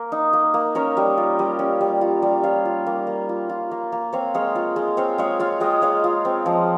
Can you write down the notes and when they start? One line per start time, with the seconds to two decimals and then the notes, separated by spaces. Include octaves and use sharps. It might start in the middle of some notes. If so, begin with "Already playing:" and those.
Already playing: A#3 A#4
0.12 D#4
0.33 A#3
0.54 A#3
0.75 C#4 A#4 C#5
0.97 G3
1.17 F4
1.39 G3
1.59 C#4
1.81 G3
2.01 F4
2.22 G3
2.43 F4 C#5 F5
2.65 F4
2.87 A#3
3.07 A#3
3.29 F4
3.49 F4
3.71 A#3
3.92 A#3
4.13 C4 C#5 F5
4.34 G#3 C#5 F5
4.55 F4
4.76 G#3
4.97 C4 C#5 F5
5.18 G#3 C#5 F5
5.40 F4 C#5 F5
5.60 G#3 D#5 G5
5.82 G#3 C#5 F5
6.04 F4
6.25 C4
6.46 F3